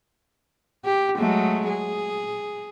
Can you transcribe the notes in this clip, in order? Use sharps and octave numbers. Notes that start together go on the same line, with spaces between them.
G4
F#3 G#3 A3
G#4